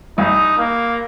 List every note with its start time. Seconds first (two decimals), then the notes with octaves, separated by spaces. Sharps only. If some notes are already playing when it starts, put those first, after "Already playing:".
0.18 C2 D#4
0.58 A#3